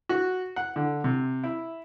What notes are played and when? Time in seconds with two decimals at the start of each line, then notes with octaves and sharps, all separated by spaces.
0.09 F#4
0.56 F#5
0.76 D3
1.04 C3
1.44 E4